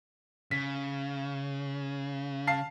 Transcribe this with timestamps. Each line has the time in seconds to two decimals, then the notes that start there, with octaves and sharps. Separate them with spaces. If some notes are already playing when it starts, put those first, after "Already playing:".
0.51 C#3 B6
2.47 F5 A5 C7